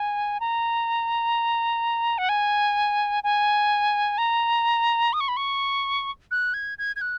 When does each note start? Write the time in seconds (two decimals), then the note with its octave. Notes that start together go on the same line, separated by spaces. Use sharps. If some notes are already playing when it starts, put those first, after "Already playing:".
Already playing: G#5
0.40 A#5
2.18 F#5
2.29 G#5
3.23 G#5
4.18 A#5
5.13 D#6
5.20 C#6
5.28 B5
5.37 C#6
6.31 F#6
6.54 G#6
6.78 G#6
6.96 G#6
7.01 F#6